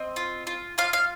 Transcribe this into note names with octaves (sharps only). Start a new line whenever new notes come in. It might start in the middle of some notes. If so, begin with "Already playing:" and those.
Already playing: C4 D#5
F4
F4
F4 F5
F5